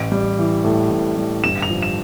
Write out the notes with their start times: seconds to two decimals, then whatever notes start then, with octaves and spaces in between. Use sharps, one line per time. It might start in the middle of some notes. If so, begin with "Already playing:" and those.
Already playing: A1 D7
0.12 G3
0.39 E3
0.64 A2
0.90 A1
1.17 G3
1.44 G1 E7
1.62 F7
1.69 F3
1.83 E7